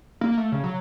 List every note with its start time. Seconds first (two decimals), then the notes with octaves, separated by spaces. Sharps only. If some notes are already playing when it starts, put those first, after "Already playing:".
0.21 A#3
0.37 A3
0.52 C#3
0.63 F#3